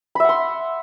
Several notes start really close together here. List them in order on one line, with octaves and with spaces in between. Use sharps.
B5 E5 F#5 C6